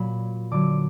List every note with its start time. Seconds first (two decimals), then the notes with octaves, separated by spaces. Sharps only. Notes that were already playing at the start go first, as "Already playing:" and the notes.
Already playing: A#2 F#3 B5
0.51 D3 F#3 D6